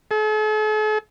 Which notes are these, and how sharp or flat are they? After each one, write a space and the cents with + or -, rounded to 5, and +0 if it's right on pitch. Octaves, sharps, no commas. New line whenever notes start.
A4 -45